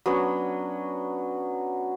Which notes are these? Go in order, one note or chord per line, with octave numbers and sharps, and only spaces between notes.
F#3 B3 C#4 D4